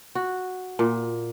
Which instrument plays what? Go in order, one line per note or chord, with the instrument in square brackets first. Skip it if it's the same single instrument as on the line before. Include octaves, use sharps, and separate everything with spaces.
[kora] F#4
A#2